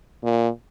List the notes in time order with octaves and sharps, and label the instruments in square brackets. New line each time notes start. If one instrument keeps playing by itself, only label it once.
[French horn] A#2